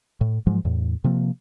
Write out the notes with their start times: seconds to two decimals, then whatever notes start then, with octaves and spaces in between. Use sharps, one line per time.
0.21 A2
0.47 G#2 F3 F#3 G#3
0.65 E2 A2
1.04 C3 F3 A#3